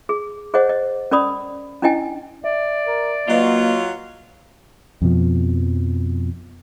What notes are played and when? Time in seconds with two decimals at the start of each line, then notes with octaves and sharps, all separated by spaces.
0.09 G#4
0.54 G#4 C5 C#5 D#5 F#5
0.69 D#5
1.11 C#4 A#4 D5 B5 D#6
1.82 C#4 D4 E4 D#5 G5 G#5
2.44 D5 E5
2.86 A#4
3.28 F#3 A#3 F4 B4 D#5
5.02 F2 B2 F3